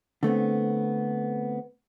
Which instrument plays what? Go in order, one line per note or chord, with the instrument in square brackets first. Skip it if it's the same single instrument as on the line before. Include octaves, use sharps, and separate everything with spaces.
[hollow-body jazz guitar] D3 A3 B3 C4